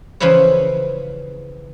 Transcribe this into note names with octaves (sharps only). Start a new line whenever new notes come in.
C#3 E3 F3 E4 C5 C#5